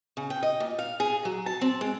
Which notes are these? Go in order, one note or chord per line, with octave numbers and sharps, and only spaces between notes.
C#3
G5
D#5
A#2
F5
G#4
F#3
A5
C4
G#3